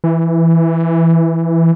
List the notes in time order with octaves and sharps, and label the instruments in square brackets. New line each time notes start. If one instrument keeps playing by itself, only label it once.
[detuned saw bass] E3